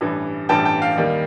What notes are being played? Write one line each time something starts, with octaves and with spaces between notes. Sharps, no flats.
A1 G2 E3
A1 G2 E3 G5 A5
G5 A5
F5 G5
D#2 D#3 G3